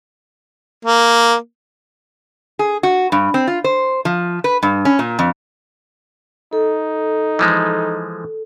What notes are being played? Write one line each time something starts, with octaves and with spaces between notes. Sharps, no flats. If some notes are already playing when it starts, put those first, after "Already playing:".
A#3
G#4
F#4
G2
C4
F4
C5
F3
B4
G2
C#4
A#2
F2
D#4 A4
E3 F3 G#3